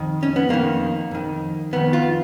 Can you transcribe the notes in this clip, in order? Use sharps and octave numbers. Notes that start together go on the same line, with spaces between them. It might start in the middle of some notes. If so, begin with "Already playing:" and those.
Already playing: F2 D#3
C#4
B3
F2 D#3 A#3
F2 D#3
F2 D#3 B3
F4